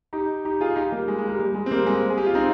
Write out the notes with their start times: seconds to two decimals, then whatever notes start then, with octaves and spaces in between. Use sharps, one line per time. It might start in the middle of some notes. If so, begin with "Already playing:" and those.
0.13 D#4 G4
0.45 D#4 G4
0.61 F4 G#4
0.76 D#4 G4
0.92 G3 A#3
1.08 G#3
1.18 G#3
1.28 G3 A#3
1.40 G3
1.55 G#3
1.66 C4
1.71 G3 A#3
1.86 G#3 C4
2.10 G#4
2.18 G4
2.26 F4
2.34 C4 D#4